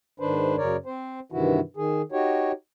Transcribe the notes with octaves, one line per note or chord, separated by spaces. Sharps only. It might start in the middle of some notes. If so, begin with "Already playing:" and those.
G#2 D#3 D4 B4 C5
F#2 C#3 A#4 C#5 D5
C4 C5
G2 C3 D#3 E3 E4 F#4
D#3 G#4
D#4 F#4 G4 C#5